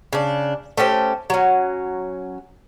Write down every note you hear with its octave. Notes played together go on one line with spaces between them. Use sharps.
C#3 D4
A3 C#4 G4 C5
F#3 C#4